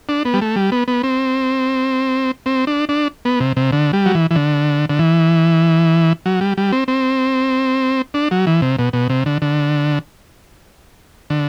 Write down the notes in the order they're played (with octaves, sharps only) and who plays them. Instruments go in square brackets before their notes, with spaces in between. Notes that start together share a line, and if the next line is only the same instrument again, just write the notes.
[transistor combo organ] D4
B3
G3
A3
G3
B3
B3
C4
C4
D4
D4
B3
C3
C3
D3
G3
F#3
E3
E3
D3
D3
E3
F#3
G3
G3
C4
C4
D4
F#3
E3
C3
B2
B2
C3
D3
D3
D3